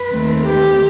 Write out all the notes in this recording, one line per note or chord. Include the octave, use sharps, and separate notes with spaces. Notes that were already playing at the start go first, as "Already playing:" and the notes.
Already playing: B4
D#2 D#3 A3 C4
G4